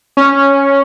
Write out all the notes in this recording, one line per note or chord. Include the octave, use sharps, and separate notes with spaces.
C#4